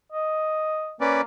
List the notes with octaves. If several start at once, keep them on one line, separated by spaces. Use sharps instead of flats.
D#5
A#3 C#4 B4 D5